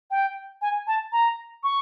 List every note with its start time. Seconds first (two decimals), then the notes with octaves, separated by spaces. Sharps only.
0.11 G5
0.62 G#5
0.87 A5
1.12 A#5
1.63 C#6